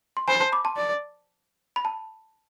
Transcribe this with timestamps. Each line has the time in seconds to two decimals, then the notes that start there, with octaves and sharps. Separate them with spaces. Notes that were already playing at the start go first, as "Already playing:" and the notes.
0.17 C6
0.28 C5 G#5 B5
0.40 A5 C6
0.52 B5 D6
0.65 A5 C6
0.77 D5
1.76 B5
1.85 A5